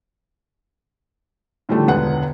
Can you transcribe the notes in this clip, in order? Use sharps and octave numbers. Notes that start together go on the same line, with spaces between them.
A2 D3 D#3 F3 G3 A3
E1 C#2 D3 B3 F#5